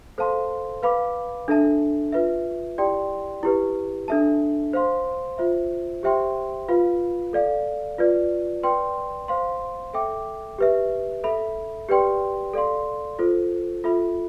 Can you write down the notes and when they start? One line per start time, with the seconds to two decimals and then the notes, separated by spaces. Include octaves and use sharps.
0.18 A4 C5 F5 A5 C6
0.83 B4 F5 B5 D6
1.48 D4 A4 E5 A5
2.12 F4 B4 E5
2.78 E4 G4 D5 G5 C6
3.43 E4 G4 B4
4.08 D4 A4 E5 A5
4.73 C5 F5 C6
5.38 F4 C5 E5
6.03 G4 C5 E5 G5 C6
6.68 F4 B4 F5 B5
7.33 A4 D5 F5
7.99 F4 B4 D5
8.63 B4 D5 G5 C6
9.28 C5 F5 C6
9.94 A4 E5 G5 D6
10.58 G4 B4 E5
11.24 A4 E5 B5
11.89 G4 B4 D5 G5 C6
12.53 A4 D5 F5 C6
13.19 F4 A4 C5
13.84 F4 A4 E5 B5